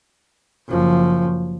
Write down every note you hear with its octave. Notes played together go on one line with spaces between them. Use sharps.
F#1 F3